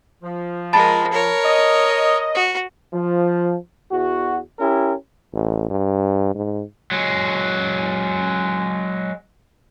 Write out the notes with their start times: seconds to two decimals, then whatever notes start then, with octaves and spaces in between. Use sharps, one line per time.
0.23 F3
0.73 G#3 A#4 A5 B5 A6
1.13 A#4 C#5
1.44 D#5
2.35 F#4
2.93 F3
3.92 E2 F#4
4.59 C#4 E4 G4 A#4
5.34 A1
5.70 G2
6.35 G#2
6.92 F#3 G#3